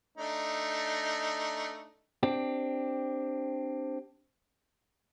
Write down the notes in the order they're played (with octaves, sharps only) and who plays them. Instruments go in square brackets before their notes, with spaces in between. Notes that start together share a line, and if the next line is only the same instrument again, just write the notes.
[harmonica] A3 D4 D#4
[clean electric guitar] C4 D4 G4